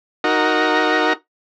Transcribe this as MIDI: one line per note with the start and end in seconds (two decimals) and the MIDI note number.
0.24 1.13 63
0.24 1.13 66
0.24 1.13 70